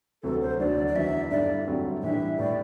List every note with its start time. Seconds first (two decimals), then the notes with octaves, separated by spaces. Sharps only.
0.23 D2 C3 F#3 B3 A4
0.42 C5
0.59 D2 D3 F#3 D5
0.87 D5
0.95 E2 D3 F#3 B3 E4 E5
1.31 G2 D3 A3 E4 D5
1.67 G2 D3 F#3 A3 C4
2.02 A2 E3 G3 D4 E5
2.38 A2 G3 B3 D5